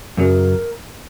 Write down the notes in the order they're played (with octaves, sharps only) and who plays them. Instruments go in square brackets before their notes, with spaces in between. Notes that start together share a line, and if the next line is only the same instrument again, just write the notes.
[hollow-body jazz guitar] F#2 C#3 F#3 [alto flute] A#4